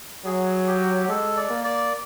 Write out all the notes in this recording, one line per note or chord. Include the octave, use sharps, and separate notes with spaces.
F#3 G#4
G4
G#3 A4
D5
A#3
D5